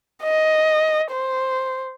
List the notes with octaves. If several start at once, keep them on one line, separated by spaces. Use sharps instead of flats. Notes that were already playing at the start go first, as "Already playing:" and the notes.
D#5
C5